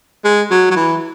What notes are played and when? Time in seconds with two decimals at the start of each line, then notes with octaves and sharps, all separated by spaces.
0.24 G#3
0.51 F#3
0.71 F#3
0.76 E3